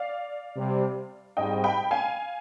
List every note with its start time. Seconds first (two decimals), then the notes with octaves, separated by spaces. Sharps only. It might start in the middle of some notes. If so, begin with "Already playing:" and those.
Already playing: D5 F5
0.57 C3 G3 C4
1.37 G#2 G3 C4 D#5 G5
1.64 G5 B5
1.91 F5 G#5